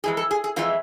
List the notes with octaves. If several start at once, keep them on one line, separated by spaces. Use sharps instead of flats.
F2 E3 G#3 G#4
A4
G#4
G#4
F2 E3 G#3 F4